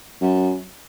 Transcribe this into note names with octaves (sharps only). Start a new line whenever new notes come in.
F#2